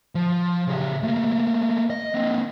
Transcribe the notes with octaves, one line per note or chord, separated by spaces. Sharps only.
F3
C#3 G4
A3 A#3
D#5
A#3 C4